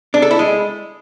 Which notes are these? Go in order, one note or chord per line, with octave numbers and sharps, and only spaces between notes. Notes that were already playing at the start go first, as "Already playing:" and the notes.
D4
A4
E4
G#3